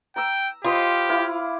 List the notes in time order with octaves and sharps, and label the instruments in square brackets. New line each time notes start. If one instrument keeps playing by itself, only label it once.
[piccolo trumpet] G5 [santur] A#5 E6
[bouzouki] F4 [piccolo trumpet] G4 [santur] C5 D#5 B5
[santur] E4 F5 D6